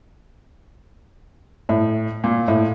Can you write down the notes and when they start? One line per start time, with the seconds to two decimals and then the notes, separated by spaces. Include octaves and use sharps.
1.69 A2
2.24 A#2
2.48 A2